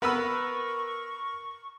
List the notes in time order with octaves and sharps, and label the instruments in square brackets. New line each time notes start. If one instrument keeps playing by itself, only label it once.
[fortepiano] B3 B4 [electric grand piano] A#4 B5 E6 [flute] C#6